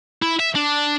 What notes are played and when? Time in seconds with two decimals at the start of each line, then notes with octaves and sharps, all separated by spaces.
0.22 E4
0.40 E5
0.55 D4